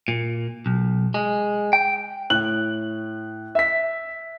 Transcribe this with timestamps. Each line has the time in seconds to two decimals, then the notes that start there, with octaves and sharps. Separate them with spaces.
0.08 A#2
0.66 B1
1.14 G#3
1.73 G5
2.30 A2 F#6 F#7
3.55 E5 B6